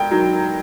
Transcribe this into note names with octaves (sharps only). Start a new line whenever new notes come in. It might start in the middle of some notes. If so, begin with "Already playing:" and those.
Already playing: E1 G5
D#3 F#3